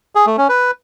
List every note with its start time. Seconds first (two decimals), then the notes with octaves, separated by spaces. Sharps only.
0.15 G#4
0.27 A3
0.38 C#4
0.49 B4